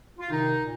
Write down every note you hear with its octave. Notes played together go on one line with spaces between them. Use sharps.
F4
C3 D#3 D#4
A#2